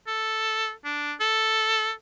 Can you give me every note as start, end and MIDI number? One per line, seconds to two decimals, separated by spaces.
0.07 0.72 69
0.85 1.13 62
1.21 1.91 69